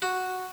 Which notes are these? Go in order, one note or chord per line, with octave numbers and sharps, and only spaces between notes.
F#4